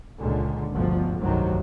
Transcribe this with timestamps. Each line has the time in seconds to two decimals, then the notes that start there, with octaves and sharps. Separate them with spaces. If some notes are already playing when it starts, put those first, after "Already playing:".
0.20 C#2 A#2 D3
0.73 G1 D2 G2 B2 F3
1.20 F1 C2 G2 C3 D#3 F#3